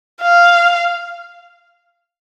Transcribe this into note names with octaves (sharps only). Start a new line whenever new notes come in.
F5